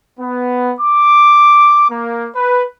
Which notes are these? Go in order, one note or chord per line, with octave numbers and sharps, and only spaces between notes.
B3
D6
A#3
B4